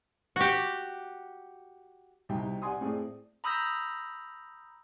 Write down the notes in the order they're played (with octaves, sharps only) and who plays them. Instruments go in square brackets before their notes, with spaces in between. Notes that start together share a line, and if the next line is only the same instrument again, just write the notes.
[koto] F#4 G4
[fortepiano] C2 B2 D#4 G5
D5 F#5 G#5 C6 D#6
A2 C4 G#4 D5
[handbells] A#5 B5 D#6 E6 G6 A#6